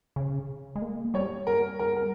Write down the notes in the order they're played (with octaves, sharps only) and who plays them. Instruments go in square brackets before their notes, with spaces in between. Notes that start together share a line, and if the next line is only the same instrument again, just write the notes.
[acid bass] C#3
G#3
A#3
[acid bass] G3 [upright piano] C#5
[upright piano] A#4
A#4
A#4